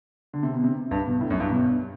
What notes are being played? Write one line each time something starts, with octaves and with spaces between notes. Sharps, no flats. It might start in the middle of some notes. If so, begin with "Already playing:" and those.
D3
C3
B2
C3
G2
B2
A2
F#2
G2
B2